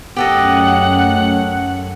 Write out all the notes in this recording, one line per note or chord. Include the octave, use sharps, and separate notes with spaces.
F#2 A3 C#4 G4 A4 D#5 F#5